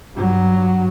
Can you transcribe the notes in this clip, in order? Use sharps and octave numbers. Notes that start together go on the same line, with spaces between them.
G2 F#3